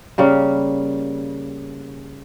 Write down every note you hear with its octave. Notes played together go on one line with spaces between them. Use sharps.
C#3 G3 A#3